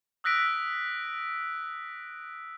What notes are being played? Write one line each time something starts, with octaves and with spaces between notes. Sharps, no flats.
D#6 E6 F#6 A#6 B6 D7